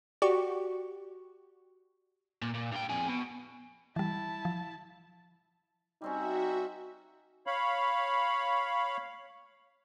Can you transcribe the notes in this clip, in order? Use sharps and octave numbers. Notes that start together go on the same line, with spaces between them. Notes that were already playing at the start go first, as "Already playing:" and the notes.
F#4 G4 D5 C#6
A#2
A#2
G2 G5
F2 G#4
B2
E3 G3 E4 A5
F3
G3 C4 C#4 D#4 F#4 E5
C#5 F5 B5